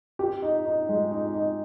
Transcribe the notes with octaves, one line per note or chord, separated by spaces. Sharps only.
G4
D#4
D#4
G#3
D#4
D#4